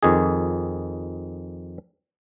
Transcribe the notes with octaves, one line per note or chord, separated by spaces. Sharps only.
F2 D#3 G#4